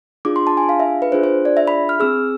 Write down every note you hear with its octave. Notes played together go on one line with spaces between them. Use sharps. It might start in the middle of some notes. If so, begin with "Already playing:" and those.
D4 F4 G#4 D6
C6
A5
G#5
F5
E5
B4
D4 F4 G#4 C5
C5
D5
E5
B5
F6
C4 G#4 E6